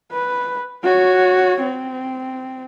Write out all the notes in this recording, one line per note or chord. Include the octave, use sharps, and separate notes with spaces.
B4
F#4 C#5
C4